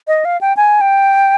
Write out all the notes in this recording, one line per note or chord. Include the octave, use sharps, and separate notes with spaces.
D#5
F5
G5
G#5
G5